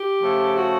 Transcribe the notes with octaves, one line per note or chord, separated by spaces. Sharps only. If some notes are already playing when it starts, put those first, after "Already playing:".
Already playing: G4
C#3 F3 A3
F#4